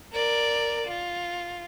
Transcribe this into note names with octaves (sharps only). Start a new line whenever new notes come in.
A#4 D5
F4